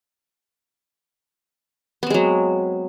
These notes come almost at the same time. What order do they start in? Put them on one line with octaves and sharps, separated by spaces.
B3 C4 G#3 F#3